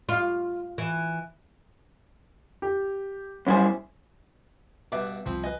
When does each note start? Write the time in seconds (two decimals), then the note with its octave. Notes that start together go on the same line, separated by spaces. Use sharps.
0.09 F4
0.78 E3
2.62 G4
3.47 B1 G3 C#4 E4 C5 G#5
4.92 G2 B2 B4 E5 D6
5.26 C2 C3 F3 C4
5.43 B4 D#5 G#5